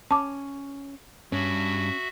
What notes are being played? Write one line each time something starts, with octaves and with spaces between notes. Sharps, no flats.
C#4 A5 D6
G2 C#4 F#4 E5